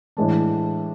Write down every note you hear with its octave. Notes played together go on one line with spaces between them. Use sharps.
A2 E3 G#3 D4